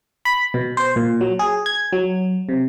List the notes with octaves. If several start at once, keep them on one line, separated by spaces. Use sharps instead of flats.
B5
B2
C5
A#2
F#3
G#4
G#6
F#3
C3